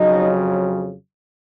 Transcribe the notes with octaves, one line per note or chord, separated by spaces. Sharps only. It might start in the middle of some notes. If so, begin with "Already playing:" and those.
Already playing: F2 C#3 F#3 D#4 D#5